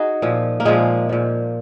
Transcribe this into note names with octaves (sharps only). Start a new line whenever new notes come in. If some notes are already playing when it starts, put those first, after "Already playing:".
Already playing: D#4 F#4 G#4
A#2 F3
A#3
A#2 F3 G#3
A#2 F3